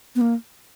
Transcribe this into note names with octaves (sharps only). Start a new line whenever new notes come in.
B3
A#3